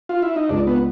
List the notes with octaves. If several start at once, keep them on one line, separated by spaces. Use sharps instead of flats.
F4
E4
D#4
C#2 D4
B3